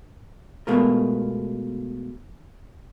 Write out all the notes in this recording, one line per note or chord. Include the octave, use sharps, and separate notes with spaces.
B2 G#3 A3 F4 A#4